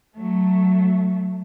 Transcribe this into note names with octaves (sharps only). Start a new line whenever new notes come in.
F#3 A3